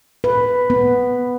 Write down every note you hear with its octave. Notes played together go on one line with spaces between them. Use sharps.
B4
B3